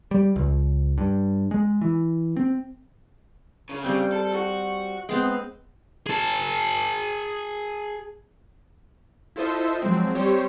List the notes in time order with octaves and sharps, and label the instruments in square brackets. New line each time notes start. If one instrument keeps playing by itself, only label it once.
[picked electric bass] G3
C#2
G2
G#3
E3
C4
[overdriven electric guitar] C#3
[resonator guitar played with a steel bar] G3 C4
[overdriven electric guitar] A4
F#4
[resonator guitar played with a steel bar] G#3 B3 C4
[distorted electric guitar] G#4 A5
[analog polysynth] E4 F4 A4 C5 D#5 E5
F3 F#3 G#3 C4
G3 C4 G4 C5 C#5